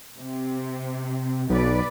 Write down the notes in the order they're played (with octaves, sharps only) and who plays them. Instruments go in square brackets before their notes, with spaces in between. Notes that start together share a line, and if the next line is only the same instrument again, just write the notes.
[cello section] C3
[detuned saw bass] B1 [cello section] B2 B4 D5